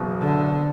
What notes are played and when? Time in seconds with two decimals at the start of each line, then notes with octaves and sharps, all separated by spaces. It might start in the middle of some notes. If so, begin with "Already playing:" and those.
Already playing: F#1 E2 B2
0.20 D3